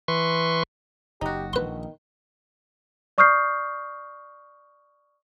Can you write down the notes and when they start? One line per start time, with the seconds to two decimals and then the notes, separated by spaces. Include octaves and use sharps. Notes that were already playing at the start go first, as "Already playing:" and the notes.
0.08 E3 B4 C6 C#6
1.21 F#1 D#4 F#4 G4
1.53 A#1 D#3 B4 C6
3.18 D5 C#6 D#6 F6 G6 C7